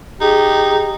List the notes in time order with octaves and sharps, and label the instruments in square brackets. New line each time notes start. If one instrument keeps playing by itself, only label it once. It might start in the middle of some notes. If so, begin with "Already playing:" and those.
[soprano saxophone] D#4 [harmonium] G4 [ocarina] G#4